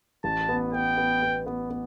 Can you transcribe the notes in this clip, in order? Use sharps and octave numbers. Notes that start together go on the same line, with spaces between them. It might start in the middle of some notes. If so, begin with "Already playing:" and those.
A1 A5
B3
B3 G5
B3
B3
B3
B3